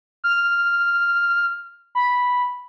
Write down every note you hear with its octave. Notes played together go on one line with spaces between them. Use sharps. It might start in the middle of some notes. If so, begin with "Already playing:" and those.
F6
B5